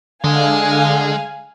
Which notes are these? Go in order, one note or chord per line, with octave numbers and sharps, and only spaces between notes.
D3 G#3 F5 G#5